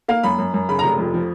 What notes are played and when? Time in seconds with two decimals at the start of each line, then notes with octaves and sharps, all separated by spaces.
0.08 A#3 F5
0.24 F#2 B5
0.39 F#2
0.54 F#2
0.69 C#3 B5
0.79 A#5
0.84 F1
0.99 F2
1.14 F3